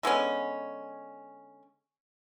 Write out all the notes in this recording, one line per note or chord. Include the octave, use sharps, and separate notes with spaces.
D3 G#3 B3 C#4